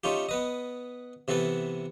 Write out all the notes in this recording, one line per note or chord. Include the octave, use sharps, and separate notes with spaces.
A3 C#4 D#4 F4 G4
B3 B4 D#5
C3 E3 B3 A4 B4